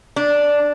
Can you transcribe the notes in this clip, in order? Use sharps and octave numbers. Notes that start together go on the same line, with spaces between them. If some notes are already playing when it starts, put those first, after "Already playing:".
D4